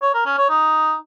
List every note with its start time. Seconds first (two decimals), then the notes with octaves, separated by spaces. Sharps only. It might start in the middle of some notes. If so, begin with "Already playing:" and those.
0.02 C#5
0.14 A#4
0.26 C#4
0.37 C#5
0.49 D#4